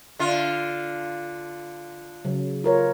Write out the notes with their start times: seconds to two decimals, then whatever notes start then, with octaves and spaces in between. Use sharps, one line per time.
0.19 D3 F4
2.25 C#3 F#3
2.64 F4 A#4 C#5